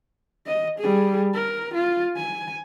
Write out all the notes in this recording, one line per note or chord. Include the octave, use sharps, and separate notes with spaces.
D#5
G3 G#4
A#4
F4
G#5